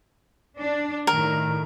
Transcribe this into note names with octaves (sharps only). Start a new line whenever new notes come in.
D4
A2 D#3 A#4